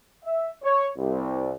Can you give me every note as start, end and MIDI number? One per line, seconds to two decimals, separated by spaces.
0.24 0.51 76
0.63 0.86 73
0.97 1.55 36